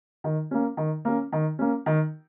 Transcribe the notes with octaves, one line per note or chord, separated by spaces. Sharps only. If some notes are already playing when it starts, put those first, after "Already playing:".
D#3
A#3 C#4
D#3
A#3 C#4
D#3
A#3 C#4
D#3